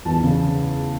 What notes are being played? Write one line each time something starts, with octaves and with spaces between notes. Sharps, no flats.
E2 A5
C#3